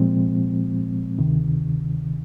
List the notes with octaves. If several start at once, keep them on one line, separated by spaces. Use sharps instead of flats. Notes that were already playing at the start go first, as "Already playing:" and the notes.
Already playing: A#2 F3 G#3 C4
D2 C3 D#3